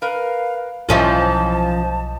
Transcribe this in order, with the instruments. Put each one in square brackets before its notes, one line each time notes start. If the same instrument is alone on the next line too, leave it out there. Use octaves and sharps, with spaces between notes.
[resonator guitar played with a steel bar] A#4 B4 [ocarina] F5
[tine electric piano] B1 D#5 [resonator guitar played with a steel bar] G#2 E3 [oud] F3 C#4 F4 [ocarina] A5